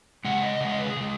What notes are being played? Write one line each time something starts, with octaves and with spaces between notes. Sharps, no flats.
C#3 G#3 F#5
D#5
C#3 G#3 F#5
D#5
B4
G#4
C#3 G#3